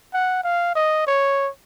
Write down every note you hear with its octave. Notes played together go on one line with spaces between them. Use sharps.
F#5
F5
D#5
C#5